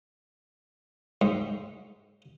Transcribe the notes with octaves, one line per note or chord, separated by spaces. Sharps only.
G#2